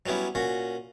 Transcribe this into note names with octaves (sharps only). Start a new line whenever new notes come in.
F#3 G3 B3 C#4 E4
A#2 C#4 F#4